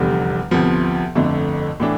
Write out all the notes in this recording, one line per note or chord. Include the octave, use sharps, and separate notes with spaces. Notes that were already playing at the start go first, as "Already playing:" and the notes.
Already playing: F1 E2 D3 G3
D2 C3 F3 B3
G1 F2 D3 A3
A2 E3 A3 D4